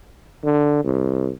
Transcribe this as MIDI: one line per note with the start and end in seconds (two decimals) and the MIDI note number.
0.44 0.80 50
0.84 1.31 36